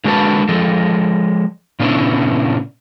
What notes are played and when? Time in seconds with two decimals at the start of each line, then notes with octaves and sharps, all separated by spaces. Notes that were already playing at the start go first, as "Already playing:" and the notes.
0.04 D3 G#3 A#3 F#4 B4 A5
0.49 F3 G#3 A4
1.80 A#2 C#3 B3 C#4 D4 E4